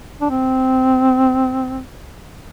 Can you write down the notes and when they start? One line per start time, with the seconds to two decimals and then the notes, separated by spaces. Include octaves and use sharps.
0.21 D4
0.30 C4